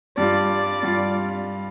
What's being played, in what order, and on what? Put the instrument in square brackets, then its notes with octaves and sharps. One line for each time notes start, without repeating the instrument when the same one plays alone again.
[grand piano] G2 G3 F4 [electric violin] D5
[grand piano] G2 G3 F4